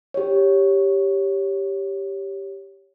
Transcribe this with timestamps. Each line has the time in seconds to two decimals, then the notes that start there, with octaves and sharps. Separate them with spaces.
0.14 G4 C#5